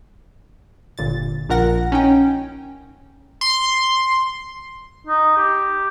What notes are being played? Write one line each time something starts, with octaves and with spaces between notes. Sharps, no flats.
G1 A#2 A6
A#1 A#2 A#4 F#5 A#6
C#4 D#4 G5
C6
D#4
G4